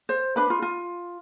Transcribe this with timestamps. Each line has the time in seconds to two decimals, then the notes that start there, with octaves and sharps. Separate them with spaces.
0.09 C5
0.36 D4 B4 B5
0.50 F4
0.62 F4